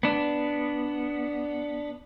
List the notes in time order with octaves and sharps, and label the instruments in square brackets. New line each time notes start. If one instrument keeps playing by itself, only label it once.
[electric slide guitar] B3 D4